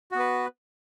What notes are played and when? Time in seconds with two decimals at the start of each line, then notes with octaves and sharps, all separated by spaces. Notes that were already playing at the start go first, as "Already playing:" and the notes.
0.12 F#4
0.16 B3
0.19 B4